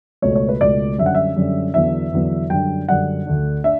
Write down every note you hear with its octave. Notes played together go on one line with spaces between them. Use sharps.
C#2 B2 A3 C#5
C#5
B4
C#2 B2 A3 D5
F#2 D3 G3 C#4 E5
F#5
E5
F#2 D3 G3 C#4
E2 D3 F#3 B3 D4 E5
E2 D3 F#3 B3 D4
F#2 D3 G3 D4 G5
F#2 D3 G3 D4 F#5
D2 D3 A3 D4
D4 E5